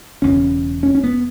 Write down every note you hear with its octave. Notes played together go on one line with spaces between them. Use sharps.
E1 E2 C#3 C#4
C#4
C#4
B3